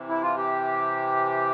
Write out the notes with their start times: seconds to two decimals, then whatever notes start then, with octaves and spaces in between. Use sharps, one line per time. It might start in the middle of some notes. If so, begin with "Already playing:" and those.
Already playing: C3 E3
0.09 E4
0.22 F4
0.36 G4